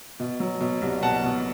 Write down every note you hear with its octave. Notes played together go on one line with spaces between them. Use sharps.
B2
F#3
B2
C2
B2 F#5 A5
B2